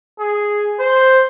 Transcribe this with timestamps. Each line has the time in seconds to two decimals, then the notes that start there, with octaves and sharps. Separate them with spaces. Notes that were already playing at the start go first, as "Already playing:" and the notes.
0.19 G#4
0.80 C5